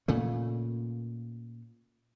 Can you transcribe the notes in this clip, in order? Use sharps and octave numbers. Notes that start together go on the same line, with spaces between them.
A#2 C#3 A3